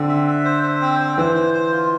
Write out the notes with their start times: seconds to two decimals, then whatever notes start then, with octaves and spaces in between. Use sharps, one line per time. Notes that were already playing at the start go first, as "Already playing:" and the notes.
Already playing: D3 C4
0.09 E5
0.27 E5
0.45 C5
0.63 C5
0.81 C4
1.00 C5
1.18 E3 C5
1.36 C5
1.54 C5
1.72 F4